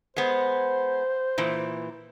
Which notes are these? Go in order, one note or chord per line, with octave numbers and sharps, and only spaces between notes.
G#3 B3 C5
A#2 E3